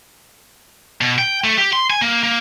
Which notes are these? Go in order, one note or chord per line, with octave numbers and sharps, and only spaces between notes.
B2
G5
A3
G4
C6
G#5
A#3
A#3